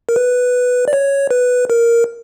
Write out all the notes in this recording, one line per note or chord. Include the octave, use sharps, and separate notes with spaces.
A#4
B4
D5
C#5
B4
A#4